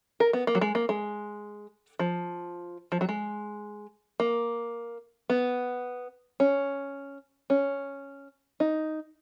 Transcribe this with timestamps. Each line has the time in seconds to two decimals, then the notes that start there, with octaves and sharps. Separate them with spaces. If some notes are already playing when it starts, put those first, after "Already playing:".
0.20 A#4
0.33 B3
0.47 A#3
0.55 F#3
0.61 G#3
0.75 A#3
0.89 G#3
1.99 F3
2.92 F3
3.01 F#3
3.09 G#3
4.20 A#3
5.30 B3
6.40 C#4
7.50 C#4
8.60 D#4